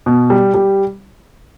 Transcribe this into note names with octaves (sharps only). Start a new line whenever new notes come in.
B2
G3
G3